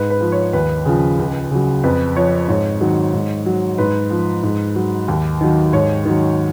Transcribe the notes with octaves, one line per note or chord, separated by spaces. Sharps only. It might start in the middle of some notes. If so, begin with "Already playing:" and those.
Already playing: G#2 B4
B4
F3
C#5
D#2 B4
C#3 F3
C#2
C#3 F#3
F2 B4
F3 C#5
G#2 C#5
D#3 F#3
G#2
F#3
G#2 B4
F3
G#2
F#3
D#2
D#3 F#3
G#2 C#5
D#3 F#3